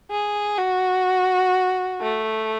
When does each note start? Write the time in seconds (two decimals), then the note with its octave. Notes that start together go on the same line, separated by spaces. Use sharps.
0.11 G#4
0.58 F#4
2.01 A3